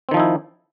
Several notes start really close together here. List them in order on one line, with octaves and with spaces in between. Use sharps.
C4 D#3 F3 D#4 E4